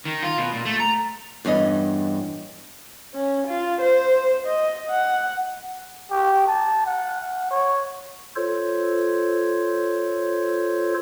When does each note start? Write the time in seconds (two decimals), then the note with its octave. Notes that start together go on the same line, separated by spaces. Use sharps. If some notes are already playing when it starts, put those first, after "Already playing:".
0.05 D#3
0.23 F4
0.38 B2
0.53 A#2
0.65 A3
0.80 A#5
1.45 E2 G2 C#4 D#5
3.14 C#4
3.48 F4
3.81 C5
4.46 D#5
4.90 F#5
6.11 G4
6.48 A5
6.86 F#5
7.51 C#5
8.36 F4 A4 C5 C#5